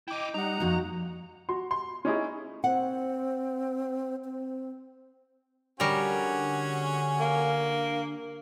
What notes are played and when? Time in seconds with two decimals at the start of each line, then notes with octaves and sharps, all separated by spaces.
0.08 E4 D#5 G5 D6
0.34 G3 D#4 F#5 A#5
0.60 F2 A#3 F#4
1.49 F#4 C6
1.71 C6
2.05 C#4 D#4 E4 G#4
2.64 C4 F#5
4.25 C4
5.80 D3 G3 C#4 F#4 G#4 A#4
7.19 A#3